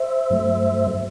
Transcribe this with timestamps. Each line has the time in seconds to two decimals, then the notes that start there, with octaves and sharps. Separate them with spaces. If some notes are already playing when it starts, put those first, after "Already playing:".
Already playing: C5 E5
0.30 G2 F#3 A3